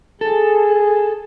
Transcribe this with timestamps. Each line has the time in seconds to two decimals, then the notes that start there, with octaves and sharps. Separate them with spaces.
0.21 G#4 A4